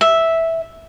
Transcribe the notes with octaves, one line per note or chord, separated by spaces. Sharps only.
E5